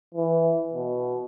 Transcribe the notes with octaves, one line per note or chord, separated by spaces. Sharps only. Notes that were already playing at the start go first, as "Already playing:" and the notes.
E3
B2